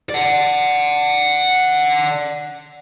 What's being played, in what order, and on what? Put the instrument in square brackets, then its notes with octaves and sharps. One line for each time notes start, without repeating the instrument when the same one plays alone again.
[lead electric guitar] D5 F#5